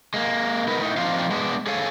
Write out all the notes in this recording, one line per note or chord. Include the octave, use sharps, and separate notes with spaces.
G#3 A#3
B3 D#4 A#4 B4
A2 D#4
F3 C4 D4 D#4 F4 F5
G#3 B3 D4
G#4 A4 C#5 F5 G#5